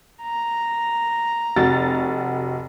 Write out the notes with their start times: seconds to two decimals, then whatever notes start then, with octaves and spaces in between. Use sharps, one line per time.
0.22 A#5
1.56 F1 F#4 A6